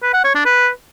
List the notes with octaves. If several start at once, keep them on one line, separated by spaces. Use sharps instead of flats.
B4
F#5
C#5
D4
B4